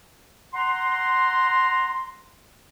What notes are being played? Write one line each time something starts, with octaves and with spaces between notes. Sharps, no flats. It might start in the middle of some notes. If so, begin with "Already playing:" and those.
F#5 A#5 C6